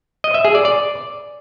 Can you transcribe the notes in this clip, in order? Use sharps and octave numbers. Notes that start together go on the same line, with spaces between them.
D#5
E5
G#4
D5
D5